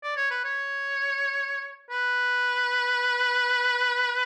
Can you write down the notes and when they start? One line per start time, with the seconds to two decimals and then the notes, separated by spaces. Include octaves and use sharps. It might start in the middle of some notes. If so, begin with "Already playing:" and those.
0.03 D5
0.16 C#5
0.30 B4
0.44 C#5
1.90 B4